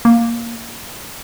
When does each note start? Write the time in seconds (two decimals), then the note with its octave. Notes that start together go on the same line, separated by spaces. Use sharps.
0.05 A#3